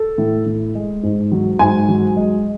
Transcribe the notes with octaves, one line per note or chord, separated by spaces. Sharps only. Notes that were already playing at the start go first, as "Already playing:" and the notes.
Already playing: A4
A2
A2
G#3
G#2
F#3
G#2 G#5
F#3
G#3